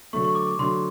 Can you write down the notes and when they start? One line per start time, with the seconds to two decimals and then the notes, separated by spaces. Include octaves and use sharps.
0.13 D3 F#3 A3 C#6
0.24 C#6
0.35 D6
0.47 D6
0.59 D3 F#3 A3 C6